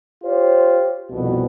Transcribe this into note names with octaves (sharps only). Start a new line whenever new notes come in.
F4 G4 C5 C#5
C2 F2 B2